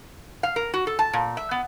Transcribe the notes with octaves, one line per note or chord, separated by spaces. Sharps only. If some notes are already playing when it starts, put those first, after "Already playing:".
F5
A#4
F#4
A4
A5
A#2
E5
B3